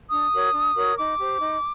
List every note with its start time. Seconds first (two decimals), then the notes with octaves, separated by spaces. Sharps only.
0.10 D4 D#6
0.32 F#4 A#4 C#5
0.53 D4
0.75 F#4 A#4 C#5
0.97 D#4 D6
1.18 G4 C5
1.40 D#4